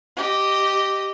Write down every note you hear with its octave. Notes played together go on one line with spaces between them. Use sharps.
G4 D#5